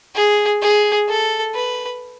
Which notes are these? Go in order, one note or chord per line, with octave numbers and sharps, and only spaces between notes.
G#4
G#4
A4
B4